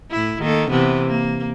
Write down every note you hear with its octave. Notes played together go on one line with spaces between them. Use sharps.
A2 E4
D#3 A#3 A4
C3 E3 B3
A#3